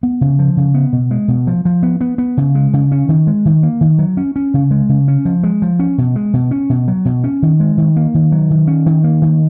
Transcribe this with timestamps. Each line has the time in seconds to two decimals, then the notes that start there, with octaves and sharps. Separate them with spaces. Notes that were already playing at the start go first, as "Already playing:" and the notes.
0.03 B3
0.21 C#3
0.39 F3
0.57 C#3
0.74 B3
0.93 B2
1.11 G#3
1.28 B2
1.47 F3
1.65 F3
1.83 B3
2.01 B3
2.18 B3
2.37 C#3
2.55 G#3
2.73 C#3
2.92 C#4
3.09 D#3
3.27 G#3
3.45 D#3
3.63 A#3
3.81 D#3
3.99 F#3
4.17 C#4
4.36 C#4
4.54 C#3
4.71 G#3
4.89 C#3
5.08 C#4
5.25 F3
5.43 G#3
5.62 F3
5.79 C#4
5.98 B2
6.16 G#3
6.33 B2
6.51 C#4
6.70 B2
6.88 F#3
7.05 B2
7.24 C#4
7.42 D#3
7.60 G#3
7.77 D#3
7.97 A#3
8.14 D#3
8.32 F#3
8.50 D#3
8.67 C#4
8.86 D#3
9.04 A#3
9.22 D#3